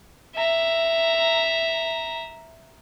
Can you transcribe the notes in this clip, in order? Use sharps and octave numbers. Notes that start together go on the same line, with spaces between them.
E5 A#5